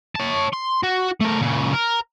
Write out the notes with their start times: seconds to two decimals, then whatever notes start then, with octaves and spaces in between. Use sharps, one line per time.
0.15 C#5 A5
0.53 C6
0.83 F#4
1.21 A3 A#4
1.41 A#2 C#3
1.74 A#4